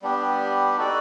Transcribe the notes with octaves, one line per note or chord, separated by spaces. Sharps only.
G3 B3 D4 G4
D#4 F#4 A4 D5